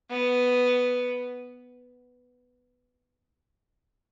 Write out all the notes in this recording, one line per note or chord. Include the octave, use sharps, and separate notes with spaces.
B3